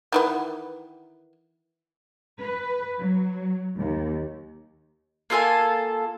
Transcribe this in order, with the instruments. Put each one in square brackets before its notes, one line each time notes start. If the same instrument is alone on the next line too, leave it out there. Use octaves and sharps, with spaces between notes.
[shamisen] D#3 E3 B3
[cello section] B4
F#3
D#2
[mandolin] A#3 F4 A4 G#5